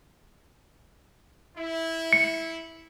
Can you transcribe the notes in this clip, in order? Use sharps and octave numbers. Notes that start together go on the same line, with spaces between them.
E4
C#7